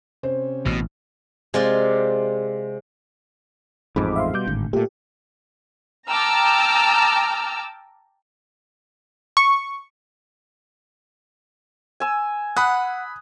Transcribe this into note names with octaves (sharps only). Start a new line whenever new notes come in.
C3 C#4 C5
A1 B2
C3 G#3 F4 D5
A1 F2 G#2 B5 D6
E5 F5 C6
B2 G3 D6 G6
G#1 A2 D3
A#2 A3 G4
G5 A5 A#5 D6 E6 F6
C#6
G#5 E6
F#5 B5 D#6 F#6